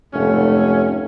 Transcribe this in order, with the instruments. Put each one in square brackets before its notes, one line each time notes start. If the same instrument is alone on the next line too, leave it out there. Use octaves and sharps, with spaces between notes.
[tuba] F1 [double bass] G#2 A3 [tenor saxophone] C#4